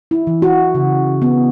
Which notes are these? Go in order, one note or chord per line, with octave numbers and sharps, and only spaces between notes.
E4
E3
F#4
C#3
B3